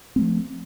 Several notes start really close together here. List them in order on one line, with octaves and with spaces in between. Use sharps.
C4 A3 F3